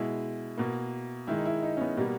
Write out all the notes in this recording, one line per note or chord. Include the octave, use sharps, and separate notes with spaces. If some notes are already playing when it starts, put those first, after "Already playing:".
Already playing: B2 G#3 E4
B2 A#3
D#3 G#3 E4
D#4
E4
D#4
C#4
B3
B2 G3 A#3